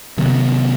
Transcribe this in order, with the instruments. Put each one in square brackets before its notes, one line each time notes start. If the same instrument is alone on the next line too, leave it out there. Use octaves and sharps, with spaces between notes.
[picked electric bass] C3 D#3 F#3 B3